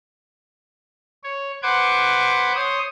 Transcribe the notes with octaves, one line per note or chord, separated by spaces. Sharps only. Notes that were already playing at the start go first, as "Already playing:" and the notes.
C#5
B4 C5 F#5 D6 G#6
C5 C#5 D#6